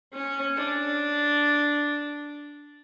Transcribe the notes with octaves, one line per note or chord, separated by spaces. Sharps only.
C#4
D4